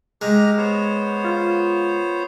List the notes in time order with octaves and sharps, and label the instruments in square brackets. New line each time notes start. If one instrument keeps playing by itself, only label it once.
[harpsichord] G#3 [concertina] G4 A#5 F6
[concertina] B3 C5 C#5
[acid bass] F4